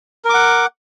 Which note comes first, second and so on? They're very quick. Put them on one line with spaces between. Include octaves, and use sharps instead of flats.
A#4 D6 F#5